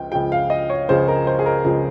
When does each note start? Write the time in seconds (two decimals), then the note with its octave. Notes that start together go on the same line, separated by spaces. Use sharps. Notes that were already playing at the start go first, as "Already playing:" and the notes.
Already playing: C#2 C#3 F3 G5
0.12 C#2 C#3 F3 G5
0.32 F5
0.50 D#5
0.70 C#5
0.89 C#2 C#3 F3 C5
1.08 A#4
1.27 C5
1.39 G#4
1.46 A#4
1.65 C#2 C#3 F3